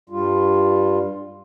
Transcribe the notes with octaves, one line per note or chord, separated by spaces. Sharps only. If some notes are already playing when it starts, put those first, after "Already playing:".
G2 G3 F4